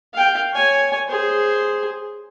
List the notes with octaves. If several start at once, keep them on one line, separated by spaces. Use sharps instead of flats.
F5 G5
C#5 G#5
G#4 C5